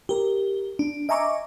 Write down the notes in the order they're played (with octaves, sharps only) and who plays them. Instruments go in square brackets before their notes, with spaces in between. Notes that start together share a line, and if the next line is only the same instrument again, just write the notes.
[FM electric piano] G4 A#4
D4
D#5 E5 G#5 A#5 C#6 D6